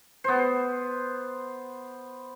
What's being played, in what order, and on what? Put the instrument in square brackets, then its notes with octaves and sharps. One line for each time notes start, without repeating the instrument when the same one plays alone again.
[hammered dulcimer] B3 C5